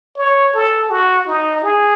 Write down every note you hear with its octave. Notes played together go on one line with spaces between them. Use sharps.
C#5
A4
F#4
D#4
G#4